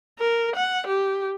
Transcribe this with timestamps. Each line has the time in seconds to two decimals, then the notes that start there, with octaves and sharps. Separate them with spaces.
0.19 A#4
0.56 F#5
0.86 G4